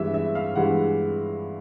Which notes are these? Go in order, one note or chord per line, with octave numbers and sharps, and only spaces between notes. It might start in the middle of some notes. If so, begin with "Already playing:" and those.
Already playing: G2 E3 G#3 E5
E5
F5
G2 E3 G#3 F#5